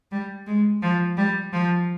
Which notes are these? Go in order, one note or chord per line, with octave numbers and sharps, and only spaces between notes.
G3
G#3
F3
G3
F3